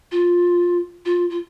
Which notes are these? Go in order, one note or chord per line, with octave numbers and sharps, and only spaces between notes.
F4
F4
F4